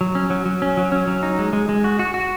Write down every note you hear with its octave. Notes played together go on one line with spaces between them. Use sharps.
F#3
C#4
F#3
F#3
C#4
F#3
C#4
F#3
D#4
G#3
G#3
G#3
F#4
F#4
F#4